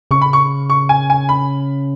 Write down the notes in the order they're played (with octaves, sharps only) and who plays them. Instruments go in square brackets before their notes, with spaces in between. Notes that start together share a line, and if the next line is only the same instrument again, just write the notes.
[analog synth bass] C#3 [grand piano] C#6
[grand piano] B5
C#6
C#6
G#5
G#5
B5